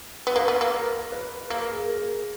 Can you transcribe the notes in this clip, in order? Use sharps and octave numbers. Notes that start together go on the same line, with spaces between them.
B3
A#3 B4
B3
A#3
A#4
B4
A#3 A#4
G#4
A#4